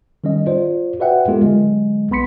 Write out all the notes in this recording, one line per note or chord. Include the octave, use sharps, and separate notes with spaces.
D#3 G3 C#4 D#5
F4 C5 D5
F#4 B4 D5 E5 F#5 G5
G#3 B3 F4 G4 A4 A#4
D3 F#3 G#3
B1 B3 B5 C6 B6 C#7